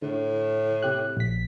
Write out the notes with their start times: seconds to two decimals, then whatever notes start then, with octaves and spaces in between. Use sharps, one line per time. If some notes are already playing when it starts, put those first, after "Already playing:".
0.02 A2 D3
0.83 C3 G4 F#6
1.17 A#1 B6